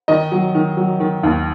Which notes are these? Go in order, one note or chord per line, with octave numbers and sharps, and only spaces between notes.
D#3 D#5
F#3
D#3
F#3
D#3
D#2